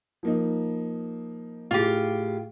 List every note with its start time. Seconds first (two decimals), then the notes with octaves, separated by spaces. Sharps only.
0.23 F3 A#3 D#4
1.71 A2 F4 G4 G#4